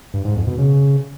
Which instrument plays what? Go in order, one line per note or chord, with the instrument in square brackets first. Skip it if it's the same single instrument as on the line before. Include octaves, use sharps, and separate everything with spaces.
[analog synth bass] G2
G#2
F2
B2
C#3